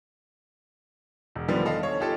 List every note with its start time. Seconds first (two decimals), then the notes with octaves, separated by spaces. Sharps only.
1.35 E1
1.48 D3 D#3 F3 G3 B3
1.65 A4 D#5 F5
1.83 C#5
2.00 D#4 F4 G4 A4